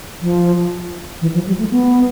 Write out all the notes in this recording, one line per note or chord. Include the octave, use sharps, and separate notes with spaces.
F3
E3
F3
G3
A3
B3